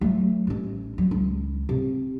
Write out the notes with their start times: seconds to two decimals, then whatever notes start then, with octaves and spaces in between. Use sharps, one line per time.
0.01 F#3 A3
0.47 A1 C#4
0.98 F#3
1.11 C#2
1.69 C3